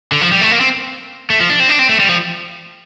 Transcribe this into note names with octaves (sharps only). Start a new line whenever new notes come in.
D3
F3
G3
A3
A#3
C4
A3
F3
D4
C4
D4
C4
A3
G3
F3